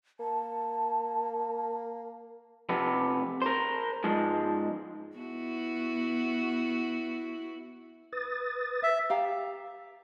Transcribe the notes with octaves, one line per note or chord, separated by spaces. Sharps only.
A#3 A5
F2 C3 B3
A#4 C5
G#2 F3 G#3
B3 E4 F#4
B4 D#6 A6
E5
G4 F5 G5 A#5